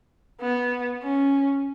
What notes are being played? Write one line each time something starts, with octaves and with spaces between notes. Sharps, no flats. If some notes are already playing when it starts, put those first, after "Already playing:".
B3
C#4